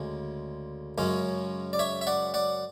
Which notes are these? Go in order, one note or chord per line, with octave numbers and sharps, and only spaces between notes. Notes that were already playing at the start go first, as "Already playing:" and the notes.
Already playing: D2 C#3 G#3
F#2 C#3 G#3 C#4
D5
C#5 E5
E5
D5 F#5
D5 F#5